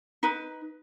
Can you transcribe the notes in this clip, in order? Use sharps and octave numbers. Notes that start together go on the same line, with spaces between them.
D#4 B4